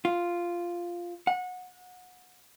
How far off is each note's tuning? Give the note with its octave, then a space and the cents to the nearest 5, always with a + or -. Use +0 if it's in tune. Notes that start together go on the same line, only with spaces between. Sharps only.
F4 -5
F#5 -25